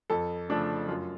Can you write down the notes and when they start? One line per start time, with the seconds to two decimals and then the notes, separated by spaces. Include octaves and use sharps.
0.10 F2 A4
0.49 C#3 F3 A3 D4
0.88 F#2 F4